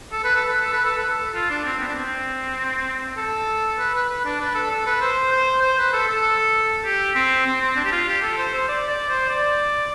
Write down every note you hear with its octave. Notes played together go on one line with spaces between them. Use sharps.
A4
B4
A4
B4
A4
B4
A4
B4
A4
F4
D4
C4
B3
D4
C4
A4
B4
B4
B4
D4
B4
A4
A4
B4
C5
C5
C5
B4
A4
A4
G4
C4
C4
C4
D4
G4
F4
G4
A4
C5
C5
D5
D5
C5
D5